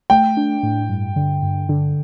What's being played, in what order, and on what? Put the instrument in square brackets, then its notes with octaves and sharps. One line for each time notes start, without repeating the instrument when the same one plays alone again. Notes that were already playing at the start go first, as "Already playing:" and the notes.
[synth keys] A3 [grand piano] G5
[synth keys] D4
A2
G2
D3
G2
D3